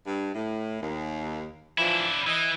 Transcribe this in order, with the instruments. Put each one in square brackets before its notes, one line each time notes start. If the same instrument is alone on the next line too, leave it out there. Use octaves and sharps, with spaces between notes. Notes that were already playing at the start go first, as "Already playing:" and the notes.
[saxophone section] G2
A2
D#2
[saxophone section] E3 F3 [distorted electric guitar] D4 E4
[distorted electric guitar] E3 [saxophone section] D#5